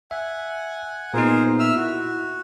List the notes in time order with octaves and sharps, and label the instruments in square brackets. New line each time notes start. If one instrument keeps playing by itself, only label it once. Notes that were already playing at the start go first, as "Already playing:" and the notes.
[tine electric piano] E5 [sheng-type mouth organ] F#5 G#5
[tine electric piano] A#2 B3 D#4 [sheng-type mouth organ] G#4 A#4 C5
[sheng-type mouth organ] E5 E6 F6
[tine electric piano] E4 [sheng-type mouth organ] F#4